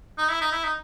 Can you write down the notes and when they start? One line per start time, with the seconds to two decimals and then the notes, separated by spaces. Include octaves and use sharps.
0.18 D#4
0.30 E4
0.41 D#4
0.52 E4
0.64 D#4